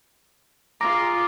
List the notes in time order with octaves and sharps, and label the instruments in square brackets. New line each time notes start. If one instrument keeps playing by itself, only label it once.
[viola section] F4 G#4 [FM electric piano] A#5 D6